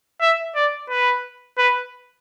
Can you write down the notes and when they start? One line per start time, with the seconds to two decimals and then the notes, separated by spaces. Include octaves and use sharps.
0.21 E5
0.55 D5
0.90 B4
1.58 B4